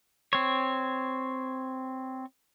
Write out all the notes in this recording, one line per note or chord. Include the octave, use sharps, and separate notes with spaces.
C4 C#5